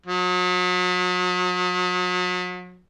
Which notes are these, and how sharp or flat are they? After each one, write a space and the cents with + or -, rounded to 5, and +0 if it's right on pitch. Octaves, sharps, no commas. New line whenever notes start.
F#3 -40